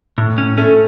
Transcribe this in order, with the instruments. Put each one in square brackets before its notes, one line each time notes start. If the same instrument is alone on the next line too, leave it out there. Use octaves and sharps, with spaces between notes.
[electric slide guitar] A2
C#4
[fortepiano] A3 [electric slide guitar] C#4